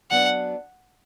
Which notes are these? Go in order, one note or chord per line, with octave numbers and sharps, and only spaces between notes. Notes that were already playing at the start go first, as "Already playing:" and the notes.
F#2 F#3 B3 D4 F#5